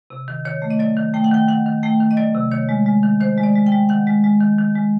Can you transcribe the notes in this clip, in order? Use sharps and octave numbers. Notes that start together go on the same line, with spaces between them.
C3
D#3
D#3 C#5
A3
D#5
F#3 D5
D#3
A3 G5
F#5
D#3 G5
D#3 F#5
D#3
A3 G5
D#3
D#5
F#3 D5
C3
D#3 C#5
G#3
G#3
D#3
D#3 C5
G#3
D5
G#3
G5
G#3
D#3 F#5
G#3
G#3
D#3
D#3
G#3